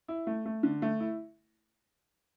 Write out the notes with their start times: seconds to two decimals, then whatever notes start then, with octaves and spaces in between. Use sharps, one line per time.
0.08 E4
0.27 A3
0.45 A3
0.63 D3
0.82 A3
1.00 E4